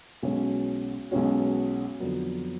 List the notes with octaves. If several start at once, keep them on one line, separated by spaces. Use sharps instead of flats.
B1 B2 G#3 C#4 F#4
B1 B2 G#3 C#4 F#4
F2 D3 F#3 B3